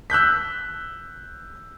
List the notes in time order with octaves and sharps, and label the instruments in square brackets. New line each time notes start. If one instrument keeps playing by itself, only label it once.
[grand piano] E6 F#6 G6 B6